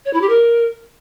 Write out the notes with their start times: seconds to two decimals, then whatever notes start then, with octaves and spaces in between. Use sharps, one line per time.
0.05 C#5
0.13 E4
0.21 G4
0.29 A#4